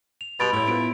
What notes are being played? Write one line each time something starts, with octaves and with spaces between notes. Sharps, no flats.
F7
B2 G3 B5 C6 A6 D7 F7
A2 E4 C#5 G6
B3 F4 B4 D7